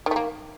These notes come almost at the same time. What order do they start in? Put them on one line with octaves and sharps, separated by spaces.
D#3 A3 A#3